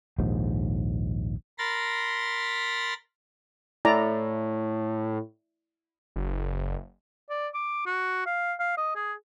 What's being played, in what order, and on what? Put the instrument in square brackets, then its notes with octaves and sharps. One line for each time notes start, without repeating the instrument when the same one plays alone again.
[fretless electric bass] A#1 D#2 G#2
[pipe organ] A#4 B5 C6 A6 A#6
[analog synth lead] A2 [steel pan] E4 D5 A#5
[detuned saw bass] F#1
[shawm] D5
D6
F#4
F5
F5
D#5
G#4